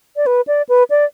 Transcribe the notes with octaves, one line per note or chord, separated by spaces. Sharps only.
D5
B4
D5
B4
D5